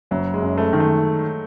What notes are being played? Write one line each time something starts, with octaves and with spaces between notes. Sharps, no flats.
F#1 F#3
G#3
F#2
A3
D#3
A3